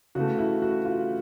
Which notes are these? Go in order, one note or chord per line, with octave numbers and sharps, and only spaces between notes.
C#3 E3 A3 F#4
E4
F#4
F4